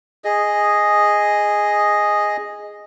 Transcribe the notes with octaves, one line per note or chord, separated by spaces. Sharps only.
G#4 D#5